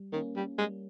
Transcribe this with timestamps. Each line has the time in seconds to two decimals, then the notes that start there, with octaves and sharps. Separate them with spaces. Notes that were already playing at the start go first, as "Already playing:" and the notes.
Already playing: G3
0.12 D#3 A#3 C#4
0.36 G3
0.58 G3 G#3